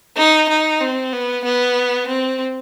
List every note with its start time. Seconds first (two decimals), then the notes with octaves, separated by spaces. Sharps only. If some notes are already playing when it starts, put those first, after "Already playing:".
0.17 D#4
0.49 D#4
0.80 C4
1.12 B3
1.44 B3
2.08 C4